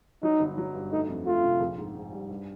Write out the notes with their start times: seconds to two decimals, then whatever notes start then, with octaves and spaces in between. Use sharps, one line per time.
0.23 F#3 D#4
0.40 G1
0.58 F#3
0.74 G2
0.92 A3 D#4
1.09 F2
1.26 A3 F4
1.44 C3
1.60 A#1
1.78 G#2
1.95 G#2
2.13 G3
2.30 G2